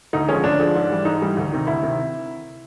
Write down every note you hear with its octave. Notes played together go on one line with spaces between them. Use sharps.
D2 D#4
D3 F3 G#3 C#4
D2 D4
D3 F3 G#3
G#2
E3 G3
G#2 D#4
E3 G3
D2
C3 D#3
D2 E4
C3 D#3